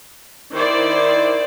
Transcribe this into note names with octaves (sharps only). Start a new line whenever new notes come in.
D#3 E4 C5 D5